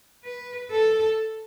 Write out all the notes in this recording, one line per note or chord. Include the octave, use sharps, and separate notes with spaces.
B4
A4